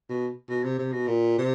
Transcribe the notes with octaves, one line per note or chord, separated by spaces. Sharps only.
B2
B2
C3
C3
B2
A#2
C3